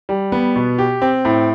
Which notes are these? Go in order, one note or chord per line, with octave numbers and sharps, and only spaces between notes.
G3
B3
B2
G4
C4
A2